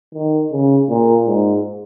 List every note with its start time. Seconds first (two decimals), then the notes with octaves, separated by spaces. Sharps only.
0.14 D#3
0.52 C#3
0.90 A#2
1.27 G#2